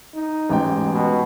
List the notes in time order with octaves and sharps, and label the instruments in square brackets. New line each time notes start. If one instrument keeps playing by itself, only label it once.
[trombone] D#4
[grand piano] A1 G#2 G5
[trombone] B2